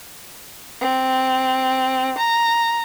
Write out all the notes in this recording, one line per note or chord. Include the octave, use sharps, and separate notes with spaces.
C4
A#5